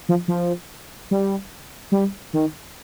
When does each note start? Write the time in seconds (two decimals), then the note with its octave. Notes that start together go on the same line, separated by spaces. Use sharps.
0.09 F3
0.28 F3
1.11 G3
1.92 G3
2.33 D#3